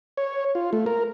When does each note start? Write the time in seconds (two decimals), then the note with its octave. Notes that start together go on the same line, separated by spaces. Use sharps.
0.17 C#5
0.55 F4
0.73 A3
0.86 A#4